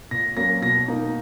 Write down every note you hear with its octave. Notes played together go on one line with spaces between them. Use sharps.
A#2 A#6
F#3 A#3 C#4 A#6
B2 A#6
A#3 D#4